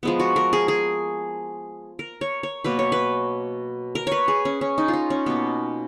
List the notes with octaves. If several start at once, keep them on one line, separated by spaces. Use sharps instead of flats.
F3 G#3 B3
F#4
A#4
G#4
G#4
A#4
C#5
C#5
B2 F#3 A#3 B4
C#5
B4
A#4
B4 C#5
G#4
C#4
C#4
D#4
F4
D#4
C#4
B2 A#3 B3